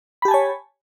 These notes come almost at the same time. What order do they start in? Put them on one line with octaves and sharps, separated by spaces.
B5 G4 A5 G#5 C#5